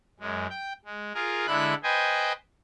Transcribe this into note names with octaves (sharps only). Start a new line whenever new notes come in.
F#2 G#3
G5
G#3
F4 G#4 A#4
D3 G#3 E4 B5 F#6
B4 C5 D#5 G5 G#5